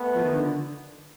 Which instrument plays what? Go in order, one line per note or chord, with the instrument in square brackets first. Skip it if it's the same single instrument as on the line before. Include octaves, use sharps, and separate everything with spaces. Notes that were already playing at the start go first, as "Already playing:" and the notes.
Already playing: [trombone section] A3 B3
[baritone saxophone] F3
D#3
D3
D3